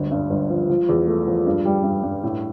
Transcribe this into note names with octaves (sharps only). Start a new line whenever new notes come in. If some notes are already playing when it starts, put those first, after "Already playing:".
Already playing: G1 D2
G2
G1
F3
F3
E2
A3
F3
G2
G3
G2
G2
A2